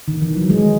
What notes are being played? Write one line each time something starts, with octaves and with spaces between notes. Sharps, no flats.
D#3
E3
F#3
G#3